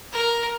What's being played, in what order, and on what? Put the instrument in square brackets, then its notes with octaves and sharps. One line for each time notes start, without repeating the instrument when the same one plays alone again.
[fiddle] A#4